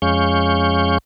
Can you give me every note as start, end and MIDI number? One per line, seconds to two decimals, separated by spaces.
0.02 0.98 41
0.02 0.98 56
0.02 0.98 61
0.02 0.98 77
0.02 0.98 85
0.02 0.98 91